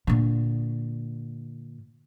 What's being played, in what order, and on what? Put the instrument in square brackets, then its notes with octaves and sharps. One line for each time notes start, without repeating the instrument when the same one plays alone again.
[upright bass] A#2 D3